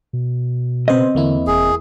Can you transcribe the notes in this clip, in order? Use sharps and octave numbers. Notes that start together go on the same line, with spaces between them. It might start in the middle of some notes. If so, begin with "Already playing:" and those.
B2
C#3 B3 C4 C5 D#5
E2 D3 A#3 E4
F1 G#4